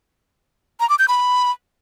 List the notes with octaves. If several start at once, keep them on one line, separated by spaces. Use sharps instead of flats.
A#5
D6
G6
B5